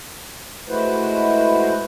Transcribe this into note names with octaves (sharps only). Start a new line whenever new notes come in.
G#3 A3 E4 F#4 B4 C5